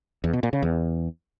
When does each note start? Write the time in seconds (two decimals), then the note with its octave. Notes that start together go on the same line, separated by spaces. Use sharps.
0.24 E2
0.33 B2
0.43 A#2
0.53 C#3
0.63 E2